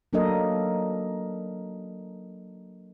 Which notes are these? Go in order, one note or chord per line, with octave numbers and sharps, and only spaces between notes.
F#3 A#3 D4 A4 A#4 D#5